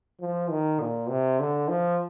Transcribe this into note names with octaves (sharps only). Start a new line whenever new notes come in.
F3
D#3
A#2
C3
D3
F3